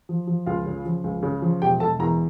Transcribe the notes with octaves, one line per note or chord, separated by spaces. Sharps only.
F3
F3
C#2 F4 F5
C#3
F3
C#2
C#3
F3
E1 G4 G5
E1 A4 A5
E2 A#4 A#5